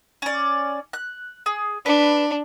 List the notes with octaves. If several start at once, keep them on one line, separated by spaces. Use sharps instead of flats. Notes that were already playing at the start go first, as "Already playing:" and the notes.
C#4 D5
F#6
G#4
D4 B4